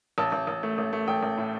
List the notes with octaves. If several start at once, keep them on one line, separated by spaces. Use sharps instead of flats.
A1 A5
A1
A1
A3
A1
A3
A1 G5
A1
A2